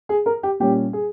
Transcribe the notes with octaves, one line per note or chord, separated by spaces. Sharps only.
G#4
A#4
G4
A#2 G3 C#4 G4
G#4